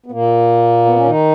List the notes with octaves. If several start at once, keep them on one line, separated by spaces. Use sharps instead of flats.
B3
A#2 A#3
B3
C#4
D#3 D#4